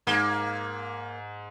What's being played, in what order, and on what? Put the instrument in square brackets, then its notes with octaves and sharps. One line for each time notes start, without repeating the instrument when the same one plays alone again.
[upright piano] G#2 [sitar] A#3